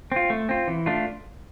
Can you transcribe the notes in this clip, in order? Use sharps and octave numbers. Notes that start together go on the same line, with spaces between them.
C4 F4
A3
C4 F4
E3
A3 D4 F4